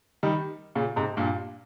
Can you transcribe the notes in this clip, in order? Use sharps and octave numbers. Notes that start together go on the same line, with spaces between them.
D#3 G3
A#2 C#3
G#2 C3
G2 A#2